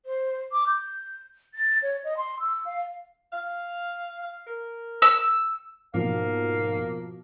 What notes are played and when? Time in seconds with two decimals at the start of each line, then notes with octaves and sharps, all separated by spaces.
0.06 C5
0.52 D6
0.67 G6
1.54 A6
1.82 C#5
2.04 D#5
2.17 C6
2.40 E6
2.65 F5
3.33 F5
4.22 F5
4.46 A#4
5.02 E6
5.94 G#2 B2 F3 A#3 F5